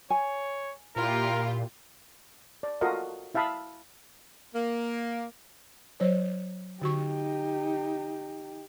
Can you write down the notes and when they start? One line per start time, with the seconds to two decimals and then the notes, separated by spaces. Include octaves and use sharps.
0.10 C#5 G#5
0.96 A#2 E4 F4 G4 A#4
2.63 D5
2.81 F4 F#4 A4 A#4 D#5 F5
3.34 E4 E5 F5 A5 B5 D#6
4.55 A#3
6.00 F#3 C5 C#5
6.82 D3 D#4 F#4 G4 C#6